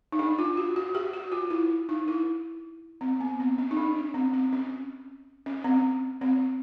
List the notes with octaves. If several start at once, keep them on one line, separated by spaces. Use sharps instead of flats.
D#4
D4
F4
F#4
F#4
G4
F#4
F4
E4
D#4
E4
C4
B3
C4
C#4
D#4
D4
C#4
C4
C4
C#4
C#4
C4
C4